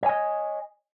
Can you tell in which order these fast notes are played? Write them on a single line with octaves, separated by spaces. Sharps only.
C#5 G#5 D#5